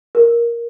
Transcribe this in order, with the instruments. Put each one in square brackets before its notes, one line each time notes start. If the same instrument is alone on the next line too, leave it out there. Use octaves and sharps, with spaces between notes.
[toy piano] A#4